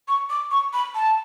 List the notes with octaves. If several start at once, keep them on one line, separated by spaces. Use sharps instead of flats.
C#6
D6
C#6
B5
A5